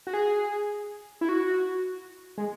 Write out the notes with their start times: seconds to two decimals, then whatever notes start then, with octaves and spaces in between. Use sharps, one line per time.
0.07 F#4
0.14 G#4
1.21 E4
1.29 F#4
2.38 G#3